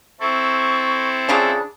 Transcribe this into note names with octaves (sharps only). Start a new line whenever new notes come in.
C4 E4 A4 C#6
C#3 F3 D4 G#4